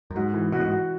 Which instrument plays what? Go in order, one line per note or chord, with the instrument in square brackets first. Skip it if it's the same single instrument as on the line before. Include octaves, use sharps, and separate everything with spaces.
[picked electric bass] F#2
[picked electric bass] G#2 [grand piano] F#4
[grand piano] E3
[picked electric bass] B2 [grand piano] F#4
[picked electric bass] A2
G#2
[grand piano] F#4